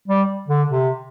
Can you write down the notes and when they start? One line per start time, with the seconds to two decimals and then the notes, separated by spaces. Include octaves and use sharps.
0.08 G3
0.48 D3
0.69 C3